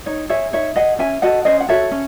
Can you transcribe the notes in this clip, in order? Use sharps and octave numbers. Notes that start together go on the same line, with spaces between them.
D#4 C#5
G#4 C#5 E5
D#4 C#5 E5
G#4 D#5 F#5
C#4 E5 G#5
F#4 A4 D#5 F#5
C#4 C5 D#5
F#5
F#4 A4 C#5 E5
C#4